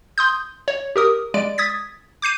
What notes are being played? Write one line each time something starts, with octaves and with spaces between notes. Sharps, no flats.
C6 D#6 G6
C#5
G4 A#4 D#6
G#3 D5 D7
D#6 G#6 A6 B6
D6 G6 C7 D#7